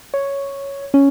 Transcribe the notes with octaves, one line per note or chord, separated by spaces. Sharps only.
C#5
C#4